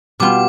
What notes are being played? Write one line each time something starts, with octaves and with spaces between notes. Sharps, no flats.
B2 G3 B3 F4 D6